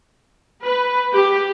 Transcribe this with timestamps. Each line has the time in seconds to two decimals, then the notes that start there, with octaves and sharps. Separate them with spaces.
0.64 B4
1.13 G4